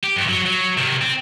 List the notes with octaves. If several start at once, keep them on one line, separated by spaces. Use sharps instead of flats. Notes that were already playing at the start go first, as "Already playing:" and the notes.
G4
F#2 D#3
F#3
F#3
C3 D#3
C4